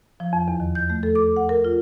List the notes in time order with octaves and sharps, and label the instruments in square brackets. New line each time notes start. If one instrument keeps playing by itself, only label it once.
[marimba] F3
F2
E2
D#3
G6
A3
A4
D6
F#5
A#4
F4